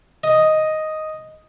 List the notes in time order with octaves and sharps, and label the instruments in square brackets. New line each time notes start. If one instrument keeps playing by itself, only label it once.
[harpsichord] D#5